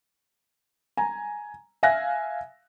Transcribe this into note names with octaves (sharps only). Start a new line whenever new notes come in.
G#5 A#5
E5 F5 G#5 F#6 A#6